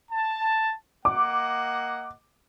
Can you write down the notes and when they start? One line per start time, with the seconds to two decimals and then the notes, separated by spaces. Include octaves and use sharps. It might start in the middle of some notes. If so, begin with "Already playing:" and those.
0.10 A5
1.05 A#3 D#5 F#5 D6